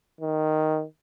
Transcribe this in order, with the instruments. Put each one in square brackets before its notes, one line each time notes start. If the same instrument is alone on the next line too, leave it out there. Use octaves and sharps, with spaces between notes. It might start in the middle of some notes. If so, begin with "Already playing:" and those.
[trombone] D#3